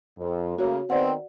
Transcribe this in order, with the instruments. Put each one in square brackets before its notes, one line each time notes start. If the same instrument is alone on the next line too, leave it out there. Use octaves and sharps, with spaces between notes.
[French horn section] F2
[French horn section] C#3 A3 A#3 [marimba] F#4 C#5
[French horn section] D#3 B3 C4 [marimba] D5 F#5